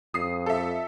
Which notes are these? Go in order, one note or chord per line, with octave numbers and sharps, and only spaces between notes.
F2 D#6 C7
A4 E5